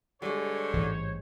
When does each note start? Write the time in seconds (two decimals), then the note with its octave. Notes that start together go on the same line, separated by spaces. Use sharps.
0.22 D3 G3 G#3 C5 C#5
0.74 A1 G#2 E3